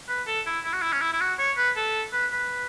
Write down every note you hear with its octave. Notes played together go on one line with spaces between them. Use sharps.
B4
A4
E4
E4
F#4
E4
C#4
E4
E4
F#4
C#5
B4
A4
B4
B4